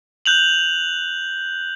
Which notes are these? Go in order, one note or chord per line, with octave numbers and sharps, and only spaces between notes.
F#6 G6 F7 F#7